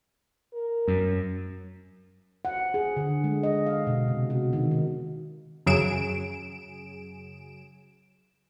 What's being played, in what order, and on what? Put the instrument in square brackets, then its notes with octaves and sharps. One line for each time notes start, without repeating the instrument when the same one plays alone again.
[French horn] A#4
[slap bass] F#2
[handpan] F#5
G#4
D3
G#3
D#5
F5
B2
C3
F#4
D#3
D#4
[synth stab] F#2 C#3 F#3 G#4 D7 E7